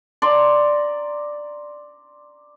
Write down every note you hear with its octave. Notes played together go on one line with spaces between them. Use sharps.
D5 A#5 C6